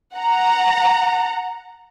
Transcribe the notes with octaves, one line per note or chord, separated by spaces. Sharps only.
F#5 A#5